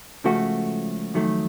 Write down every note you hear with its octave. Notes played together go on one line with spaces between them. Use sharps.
C#2 C#3 F3 A3 F#4
F2 D#3 F#3 A3